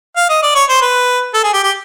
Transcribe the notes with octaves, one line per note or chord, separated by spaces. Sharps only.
F5
D#5
D5
C#5
C5
B4
A4
G#4
G4
G4